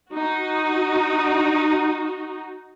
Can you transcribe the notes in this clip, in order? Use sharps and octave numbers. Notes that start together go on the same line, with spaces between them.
D#4 F#4